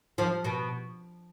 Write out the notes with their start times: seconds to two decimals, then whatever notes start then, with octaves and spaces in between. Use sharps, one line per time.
0.18 F3
0.44 B2